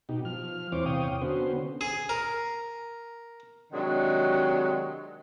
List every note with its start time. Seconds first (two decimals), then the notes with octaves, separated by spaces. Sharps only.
0.09 B2 D#4 G4
0.25 F3 F6
0.72 E2 E3 C4 C5 C#5 D6
0.86 E2 C3 C#5 F5 G5 D#6
1.22 D3 B3 C#4 F#4 C5
1.81 G#4
2.09 A#4
3.72 C3 D#3 F#3 G#3 D4